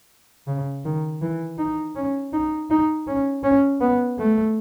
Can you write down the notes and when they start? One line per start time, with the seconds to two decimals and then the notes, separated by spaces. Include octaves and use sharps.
0.47 C#3
0.85 D#3
1.22 E3
1.58 D#4
1.96 C#4
2.33 D#4
2.70 D#4
3.07 C#4
3.43 C#4
3.81 B3
4.19 A3